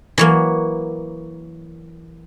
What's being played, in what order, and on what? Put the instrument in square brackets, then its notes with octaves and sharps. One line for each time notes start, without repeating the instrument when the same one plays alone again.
[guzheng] E3 F#3 A#3